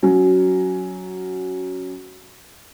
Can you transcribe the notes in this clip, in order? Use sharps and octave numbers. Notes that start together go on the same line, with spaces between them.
F#3 C#4